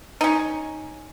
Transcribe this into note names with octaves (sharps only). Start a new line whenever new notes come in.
C#4 D#4